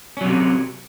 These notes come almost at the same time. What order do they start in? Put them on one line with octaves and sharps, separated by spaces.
C#4 F#3 C3